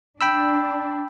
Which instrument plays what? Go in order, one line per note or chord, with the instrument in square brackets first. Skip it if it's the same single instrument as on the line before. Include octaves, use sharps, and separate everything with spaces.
[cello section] D4 [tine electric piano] G5 B5 E6